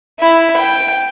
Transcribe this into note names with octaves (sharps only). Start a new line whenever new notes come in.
E4
G5